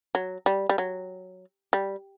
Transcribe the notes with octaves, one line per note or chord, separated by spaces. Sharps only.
F#3
G3
G3
F#3
G3